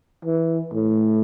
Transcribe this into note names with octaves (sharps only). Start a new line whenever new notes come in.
E3
A2